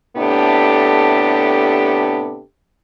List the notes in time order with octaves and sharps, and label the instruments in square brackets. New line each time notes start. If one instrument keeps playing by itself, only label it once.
[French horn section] A2 C3 B3 D4 G4 A4